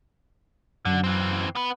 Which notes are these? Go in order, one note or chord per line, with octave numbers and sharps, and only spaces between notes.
F#2 D3
E3 C4
B3 B4